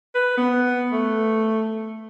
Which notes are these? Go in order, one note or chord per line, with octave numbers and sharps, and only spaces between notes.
B4
B3
A3